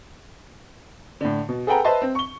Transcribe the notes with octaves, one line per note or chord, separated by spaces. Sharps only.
A2 D3
B2
G#4 A4 B4 F#5 G5 A#5
B4 C5 D#5 E5 A5 C6
C4
C#6 G7